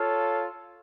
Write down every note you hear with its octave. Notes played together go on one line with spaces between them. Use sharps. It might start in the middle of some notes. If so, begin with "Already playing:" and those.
Already playing: F4 A4 C#5 F5